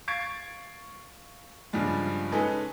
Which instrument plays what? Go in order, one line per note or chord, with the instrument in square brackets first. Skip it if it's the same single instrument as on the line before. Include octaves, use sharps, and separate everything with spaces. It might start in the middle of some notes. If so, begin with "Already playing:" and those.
[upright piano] F5 C#6 G#6 A6 C7 D7
G2 C#3 F3 G3 G#3
G#3 C#4 D#4 G#4 A4 B4